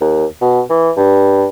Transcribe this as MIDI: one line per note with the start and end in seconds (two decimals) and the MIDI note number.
0.01 0.26 39
0.42 0.61 47
0.70 0.91 52
0.97 1.46 43